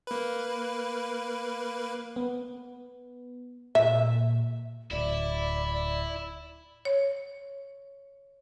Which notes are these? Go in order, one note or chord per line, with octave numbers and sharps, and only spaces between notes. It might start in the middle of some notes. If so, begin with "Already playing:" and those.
A#3 B4
B3
A#2 E5
D1 E4 D5
C#5